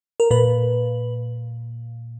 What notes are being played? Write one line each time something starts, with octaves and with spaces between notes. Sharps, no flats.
A#4
A#2 B4